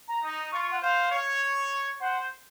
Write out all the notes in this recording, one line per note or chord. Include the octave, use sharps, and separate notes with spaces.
A#5
D#4
F4 C#6
C#6
F#5
C5 F5
C#5
C5 F#5